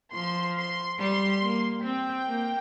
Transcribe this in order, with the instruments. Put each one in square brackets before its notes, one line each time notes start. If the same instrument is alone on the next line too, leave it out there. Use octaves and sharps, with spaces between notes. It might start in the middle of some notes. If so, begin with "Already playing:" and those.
[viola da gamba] F3 [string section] C6
[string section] C6
[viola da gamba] G3 [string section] C6
[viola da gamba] A#3
[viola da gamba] C4 [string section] G5
[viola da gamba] A#3